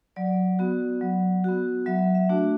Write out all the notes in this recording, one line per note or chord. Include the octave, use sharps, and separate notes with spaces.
F#3 D5
B3 F#4
F#3
B3 F#4
F#3 E5
E5
A3 D4 F#4